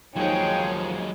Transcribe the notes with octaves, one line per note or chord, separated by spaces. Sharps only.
D#2 F3 F#3 G#3 D#4 G#4 C#5 G5